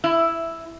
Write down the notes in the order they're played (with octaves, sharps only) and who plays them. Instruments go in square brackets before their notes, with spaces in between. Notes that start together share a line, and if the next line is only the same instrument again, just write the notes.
[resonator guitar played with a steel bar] E4